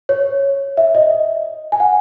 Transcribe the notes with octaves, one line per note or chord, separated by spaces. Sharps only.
C#5
E5
D#5
G#5
F#5